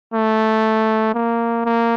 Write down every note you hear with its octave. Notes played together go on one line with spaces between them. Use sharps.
A3
A#3
A#3